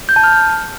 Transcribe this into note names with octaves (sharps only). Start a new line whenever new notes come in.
G6
A5
F6